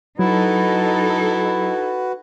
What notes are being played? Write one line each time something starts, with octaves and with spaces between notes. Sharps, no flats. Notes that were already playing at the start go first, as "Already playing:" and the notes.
F#3 D#4 E4 F#4 A4 B4